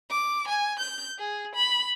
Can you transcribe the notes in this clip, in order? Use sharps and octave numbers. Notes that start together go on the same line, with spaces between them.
D6
G#5
G6
G#4
B5